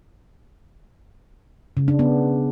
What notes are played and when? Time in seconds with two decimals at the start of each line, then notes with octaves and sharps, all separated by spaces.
1.77 C#3
1.88 D4
1.99 B3